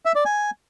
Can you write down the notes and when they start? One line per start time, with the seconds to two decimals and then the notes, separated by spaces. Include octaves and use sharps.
0.05 E5
0.15 D5
0.25 G#5